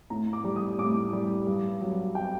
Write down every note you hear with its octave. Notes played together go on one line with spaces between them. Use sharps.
A2 A#5
D6
G3
D#6
A2 D6
G3
G2
F#3
G5